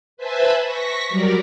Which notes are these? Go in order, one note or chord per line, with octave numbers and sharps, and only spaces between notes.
B4 C5 E5 G#5 A5 B5
C#6 A#6 B6
F#3 G3 A#4 D5